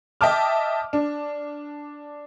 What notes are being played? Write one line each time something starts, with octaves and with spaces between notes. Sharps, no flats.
D#5 E5 G5 A5 D6 F6
D4